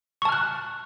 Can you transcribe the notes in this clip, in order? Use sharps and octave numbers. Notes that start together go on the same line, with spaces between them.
A5 C#6 F6 F#6